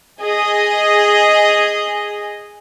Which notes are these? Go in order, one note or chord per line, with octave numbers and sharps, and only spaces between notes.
G#4 D#5